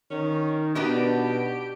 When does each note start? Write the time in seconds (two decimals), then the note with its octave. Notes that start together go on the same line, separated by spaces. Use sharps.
0.11 D#3 C#4
0.75 B2 B3 D4 D#4 G4